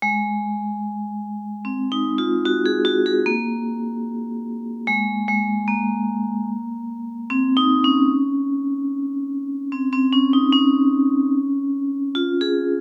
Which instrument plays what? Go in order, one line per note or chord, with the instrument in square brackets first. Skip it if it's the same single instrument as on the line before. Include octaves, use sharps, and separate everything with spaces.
[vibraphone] G#3
C4
D#4
F4
F#4
G#4
F#4
G#4
A#3
G#3
G#3
A#3
C4
D#4
C#4
C4
C4
C#4
D#4
C#4
F4
G#4